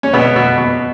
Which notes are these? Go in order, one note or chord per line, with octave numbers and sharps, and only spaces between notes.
C#4
B2 B3
B2
B2